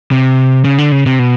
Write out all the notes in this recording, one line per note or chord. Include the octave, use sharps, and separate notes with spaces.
C3
C#3
D3
C#3
C3
B2